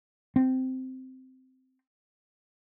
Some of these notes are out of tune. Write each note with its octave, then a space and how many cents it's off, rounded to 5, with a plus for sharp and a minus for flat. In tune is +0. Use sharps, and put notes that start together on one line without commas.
C4 -10